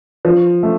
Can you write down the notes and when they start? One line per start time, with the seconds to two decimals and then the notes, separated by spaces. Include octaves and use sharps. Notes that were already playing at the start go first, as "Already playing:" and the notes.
0.25 F3
0.63 A3